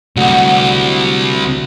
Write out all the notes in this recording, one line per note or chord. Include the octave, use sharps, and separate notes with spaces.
C2 D3 F#3 A3